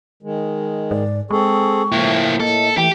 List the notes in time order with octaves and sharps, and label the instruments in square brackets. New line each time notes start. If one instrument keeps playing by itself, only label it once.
[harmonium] D#3 G#3
[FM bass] G#2 [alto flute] D5
[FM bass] G#3 [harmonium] C4 G#4 A4 [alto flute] C#6
[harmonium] A2 F3 G5 [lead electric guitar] A#3 E4
[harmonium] A2 [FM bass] A#3 [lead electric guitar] A4 [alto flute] D#5
[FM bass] E3 [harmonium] A3 [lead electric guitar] G4 [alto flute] G5